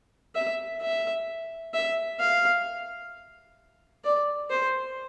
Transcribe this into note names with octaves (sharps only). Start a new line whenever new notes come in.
E5
E5
E5
F5
D5
C5